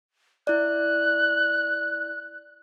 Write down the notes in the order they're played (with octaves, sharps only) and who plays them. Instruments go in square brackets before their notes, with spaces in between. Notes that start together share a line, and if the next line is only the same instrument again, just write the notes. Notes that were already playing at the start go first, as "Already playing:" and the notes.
[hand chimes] E4 D5 [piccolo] F#6